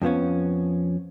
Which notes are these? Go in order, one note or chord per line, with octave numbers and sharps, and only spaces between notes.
F2 F3 B3 C#4